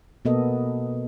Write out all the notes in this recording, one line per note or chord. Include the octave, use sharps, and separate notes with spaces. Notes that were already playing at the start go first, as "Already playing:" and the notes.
B2 A#3 B3 A4 D#5